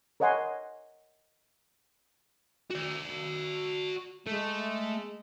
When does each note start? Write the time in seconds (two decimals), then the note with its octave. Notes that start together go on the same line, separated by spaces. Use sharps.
0.20 A#4 C#5 D#5 F#5 G#5 C6
2.71 F#4 D5
4.27 G#3 A3